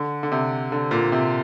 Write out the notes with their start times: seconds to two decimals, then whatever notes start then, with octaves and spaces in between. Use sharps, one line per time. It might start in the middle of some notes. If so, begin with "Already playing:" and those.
Already playing: D3
0.23 D3
0.32 C3
0.72 D3
0.91 A#2
1.12 C3